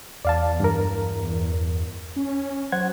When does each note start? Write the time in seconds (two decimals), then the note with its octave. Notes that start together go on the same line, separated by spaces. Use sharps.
0.25 E2 D5 F5 A5
0.60 G2 A#4
2.16 C#4
2.72 F#3 C5 F#5 G#6